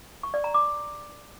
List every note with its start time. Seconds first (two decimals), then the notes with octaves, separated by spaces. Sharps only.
0.23 C#6
0.34 D5
0.44 A#5
0.54 D6